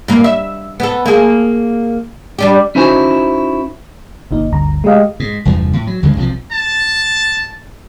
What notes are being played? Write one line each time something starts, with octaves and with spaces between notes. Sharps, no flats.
G2 A#3
E5
B3 A4
A#3 G#4
G3 D4 G4
C#4 D#4 E4 F#4 C5 G#5
G1 A#2 D#4
G1 D2 G2 A#5
G#3 A3 G4 D#5 F5
G#2
F1 E2 G2 F3
A2
F#3
D2 G2 C#3 G#3
B1 C3 D#3 F3
A5